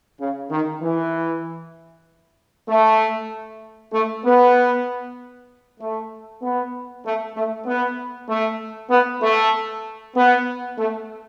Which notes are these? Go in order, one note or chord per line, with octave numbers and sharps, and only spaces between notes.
C#3
D#3
E3
A3
A3
B3
A3
B3
A3
A3
B3
A3
B3
A3
B3
A3